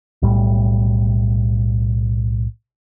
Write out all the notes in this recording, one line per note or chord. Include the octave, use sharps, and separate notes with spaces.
B1 A2 G3